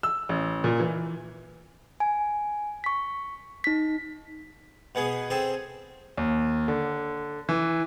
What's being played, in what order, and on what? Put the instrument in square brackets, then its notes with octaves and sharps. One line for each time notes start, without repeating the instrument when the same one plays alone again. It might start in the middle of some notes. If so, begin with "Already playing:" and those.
[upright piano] E6
A1
A#2
E3
[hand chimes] G#5
C#6 B6
D#4 B6
[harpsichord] B2 B3 G#4
C4 G#4 A4
[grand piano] D#2
D3
E3